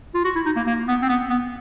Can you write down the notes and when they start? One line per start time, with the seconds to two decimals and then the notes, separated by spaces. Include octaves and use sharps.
0.14 F4
0.24 F#4
0.36 E4
0.45 D#4
0.56 A#3
0.67 A#3
0.88 B3
1.02 C4
1.09 B3
1.30 B3